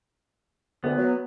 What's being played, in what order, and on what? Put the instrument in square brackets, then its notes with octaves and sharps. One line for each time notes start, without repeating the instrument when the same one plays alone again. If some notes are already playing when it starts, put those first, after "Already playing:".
[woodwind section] D2 [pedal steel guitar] B3
[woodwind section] F#3